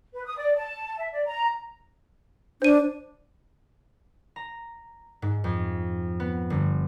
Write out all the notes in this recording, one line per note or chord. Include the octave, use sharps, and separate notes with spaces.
B4
D#6
D5
A5
E5
D5
A#5
D4 C5 D#7
A#5
G#2
F2
B3
G1